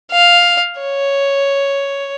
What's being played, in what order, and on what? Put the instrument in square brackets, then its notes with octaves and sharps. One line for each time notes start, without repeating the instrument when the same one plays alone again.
[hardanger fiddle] F5
C#5